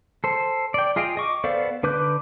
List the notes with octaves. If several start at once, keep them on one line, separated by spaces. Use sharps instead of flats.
A4 C5
D5 G5
F4 G#4 D#5 F5 G5
D#5 C#6 D6
B3 A4 C5 D5 F5
D3 B4 D6 F#6 G6